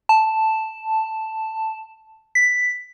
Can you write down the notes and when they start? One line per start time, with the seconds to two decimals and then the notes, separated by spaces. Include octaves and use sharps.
0.09 A5
2.35 B6